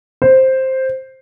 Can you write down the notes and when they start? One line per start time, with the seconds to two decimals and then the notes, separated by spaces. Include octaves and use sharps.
0.22 C5